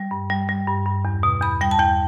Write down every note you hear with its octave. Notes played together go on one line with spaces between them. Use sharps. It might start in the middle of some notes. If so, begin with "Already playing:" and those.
Already playing: G3
G2
G3
G3
G2
G2
E2
B2
E2 B5
G3 G5
A5
E2 G5